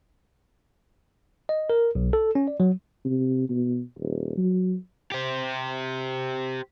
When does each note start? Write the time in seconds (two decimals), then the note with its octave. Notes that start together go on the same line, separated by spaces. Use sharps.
1.49 D#5
1.70 A#4
1.95 B1
2.13 A4
2.35 C#4
2.48 D5
2.60 F#3
3.05 C3
3.49 B2
3.99 D#1
4.37 F#3
5.12 G4 C5